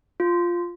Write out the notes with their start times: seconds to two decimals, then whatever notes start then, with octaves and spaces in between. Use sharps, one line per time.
0.20 F4